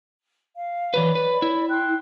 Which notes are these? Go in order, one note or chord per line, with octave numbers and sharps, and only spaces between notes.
F5
E3 F#3 B4 C#5 D5 B5
B4
E4
G5 C6 F#6